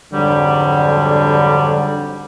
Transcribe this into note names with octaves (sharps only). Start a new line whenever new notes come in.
F2 G#2 D3 F#3 G3